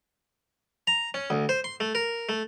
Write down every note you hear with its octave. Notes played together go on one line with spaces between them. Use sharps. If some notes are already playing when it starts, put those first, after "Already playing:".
A#5
C#4
D2
C5
C6
A3
A#4
A3